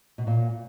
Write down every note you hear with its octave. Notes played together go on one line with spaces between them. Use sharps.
B2
A#2